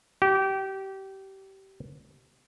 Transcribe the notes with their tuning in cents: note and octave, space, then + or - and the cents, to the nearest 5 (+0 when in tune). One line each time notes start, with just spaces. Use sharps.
G4 -25